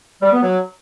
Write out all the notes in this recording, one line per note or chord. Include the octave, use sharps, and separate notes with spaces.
G3
B3
F#3